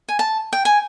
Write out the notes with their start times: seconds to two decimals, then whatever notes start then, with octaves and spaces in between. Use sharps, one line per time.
0.09 G#5
0.19 A5
0.53 G5
0.65 G#5